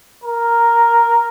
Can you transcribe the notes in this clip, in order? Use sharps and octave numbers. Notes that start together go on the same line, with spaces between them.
A#4